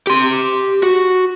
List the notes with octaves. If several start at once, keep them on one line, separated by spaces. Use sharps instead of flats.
G4 C6
F#4